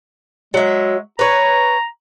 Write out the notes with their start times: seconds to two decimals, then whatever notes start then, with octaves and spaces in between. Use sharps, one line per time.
0.54 F#3 G#3 E5
1.19 B4 C#5 A#5